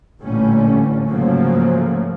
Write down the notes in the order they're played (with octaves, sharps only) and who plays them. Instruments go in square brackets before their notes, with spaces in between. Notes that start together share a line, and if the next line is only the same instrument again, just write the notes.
[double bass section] A1 A#2 D3 G3 A3 C#4
G#2 C#3 F3 F#3 A3 A#3